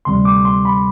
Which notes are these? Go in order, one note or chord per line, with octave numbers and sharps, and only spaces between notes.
D2 C3 G3 C6
D6
C6
B5